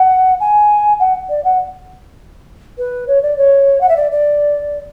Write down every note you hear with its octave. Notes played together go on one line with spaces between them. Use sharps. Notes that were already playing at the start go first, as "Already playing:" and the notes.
Already playing: F#5
G#5
F#5
D5
F#5
B4
C#5
D5
C#5
F#5
E5
D5
D5